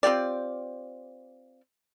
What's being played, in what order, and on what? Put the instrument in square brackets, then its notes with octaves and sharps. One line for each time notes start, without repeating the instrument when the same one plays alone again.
[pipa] C4 F4 G4 D5